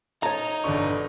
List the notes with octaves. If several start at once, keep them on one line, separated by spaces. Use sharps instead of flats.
D#4 C#5 A5 A#5
G1 B2 D3 C#6